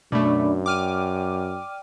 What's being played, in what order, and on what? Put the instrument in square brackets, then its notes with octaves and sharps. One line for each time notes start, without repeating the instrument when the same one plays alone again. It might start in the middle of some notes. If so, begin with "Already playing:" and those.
[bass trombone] F#2 [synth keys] B2 A3 [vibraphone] D4 D5 B5
[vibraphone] D5 G5 [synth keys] D6 F6 D#7